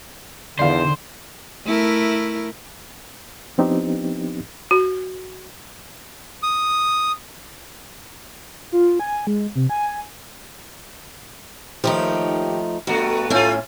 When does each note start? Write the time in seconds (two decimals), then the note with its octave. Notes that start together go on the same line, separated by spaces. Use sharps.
0.59 E2 D3 D#3 C5 D5 F5
1.66 A3 E4 A#4
3.58 F3 B3 C4 D4 D#4 G4
4.71 F#4
6.43 D#6
8.72 F4
9.00 G#5
9.27 G#3
9.55 C3
9.70 G#5
11.84 D#2 F3 A3 D#4 G4
12.87 G2 B2 A3 F#4
13.30 A2 A3 C#4 F4 G#5